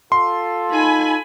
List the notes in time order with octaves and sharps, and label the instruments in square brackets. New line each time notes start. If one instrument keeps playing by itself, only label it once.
[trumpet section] F4 A4 [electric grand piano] C6
[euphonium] D#4 [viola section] G#5 B5